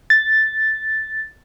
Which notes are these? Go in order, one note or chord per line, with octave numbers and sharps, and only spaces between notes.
A6